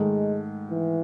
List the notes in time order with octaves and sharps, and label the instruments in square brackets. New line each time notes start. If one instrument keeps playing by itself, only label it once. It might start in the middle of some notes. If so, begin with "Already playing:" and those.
Already playing: [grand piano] G#2 D#3 A3 [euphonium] G#3
[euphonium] E3